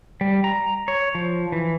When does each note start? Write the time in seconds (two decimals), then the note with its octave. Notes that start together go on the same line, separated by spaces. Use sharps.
0.21 G3
0.44 A#5
0.88 C#5
1.15 F3
1.52 E3